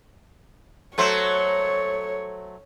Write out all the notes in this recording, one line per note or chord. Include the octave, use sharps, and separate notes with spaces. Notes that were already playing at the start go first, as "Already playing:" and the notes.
F#3 A3 C5 C#5